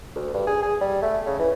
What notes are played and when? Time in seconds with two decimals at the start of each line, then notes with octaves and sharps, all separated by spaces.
0.15 D2
0.34 G2
0.47 G#4
0.62 G#4
0.81 G3
1.03 A3
1.26 C#3
1.39 E3